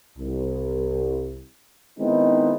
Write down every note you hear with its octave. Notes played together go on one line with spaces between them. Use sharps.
C2
D#3 G#3 B3 C4 D#4 E4